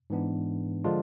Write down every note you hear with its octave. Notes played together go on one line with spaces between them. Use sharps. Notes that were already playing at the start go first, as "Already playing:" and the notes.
G#2 E3 B3 D4
D3 F3 G#3 D4 F4